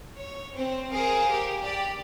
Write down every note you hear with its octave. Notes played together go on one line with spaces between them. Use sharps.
C#5
C4 C5
G#4 A#4 C5 F5
G4 A#4
G4 D5